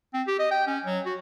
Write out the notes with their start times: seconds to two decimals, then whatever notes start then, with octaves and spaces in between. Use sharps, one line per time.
0.14 C4
0.27 G4
0.39 D#5
0.51 G5
0.67 C#4
0.85 F#3
1.06 F#4